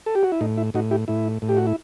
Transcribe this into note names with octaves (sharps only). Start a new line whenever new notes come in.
A4
G4
F#4
E4
A2 D#4
E4
A2 D#4 F#4
E4 G4
A2 E4
A2
G4
F#4
E4